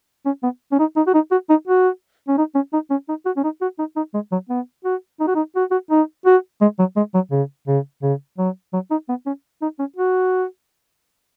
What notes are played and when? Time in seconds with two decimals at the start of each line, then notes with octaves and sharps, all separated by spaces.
0.25 C#4
0.43 B3
0.72 C#4
0.79 D#4
0.96 D#4
1.07 F#4
1.14 D#4
1.31 F#4
1.49 D#4
1.67 F#4
2.28 C#4
2.38 D#4
2.55 C#4
2.73 D#4
2.90 C#4
3.09 D#4
3.25 F#4
3.37 C#4
3.44 D#4
3.62 F#4
3.79 D#4
3.96 D#4
4.14 G#3
4.32 F#3
4.49 B3
4.85 F#4
5.20 D#4
5.27 F#4
5.35 D#4
5.56 F#4
5.71 F#4
5.91 D#4
6.26 F#4
6.61 G#3
6.79 F#3
6.96 G#3
7.14 F#3
7.31 C#3
7.68 C#3
8.02 C#3
8.38 F#3
8.73 F#3
8.91 D#4
9.09 B3
9.26 C#4
9.62 D#4
9.79 C#4
9.96 F#4